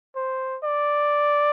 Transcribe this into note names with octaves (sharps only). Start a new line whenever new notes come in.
C5
D5